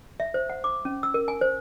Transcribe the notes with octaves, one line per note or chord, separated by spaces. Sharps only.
E5
C5
F#5
D6
C#4
E6
A#4
G#5
C5